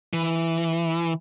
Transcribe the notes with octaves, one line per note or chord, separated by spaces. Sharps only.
E3